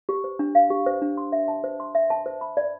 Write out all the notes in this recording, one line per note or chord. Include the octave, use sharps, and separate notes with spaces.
G4
C5
D4
F5
G4
C5
D4
C6
E5
A5
C5
C6
E5
A5
C5
B5
D5